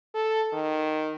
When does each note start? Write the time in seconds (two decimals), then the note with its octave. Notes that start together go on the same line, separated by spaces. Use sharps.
0.14 A4
0.53 D#3